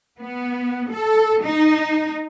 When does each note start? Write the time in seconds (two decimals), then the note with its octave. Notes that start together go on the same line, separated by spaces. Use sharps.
0.20 B3
0.91 A4
1.43 D#4